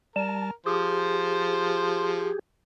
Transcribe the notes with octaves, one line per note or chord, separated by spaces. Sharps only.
G3 A#4 A5
F3 G4 G#4 C5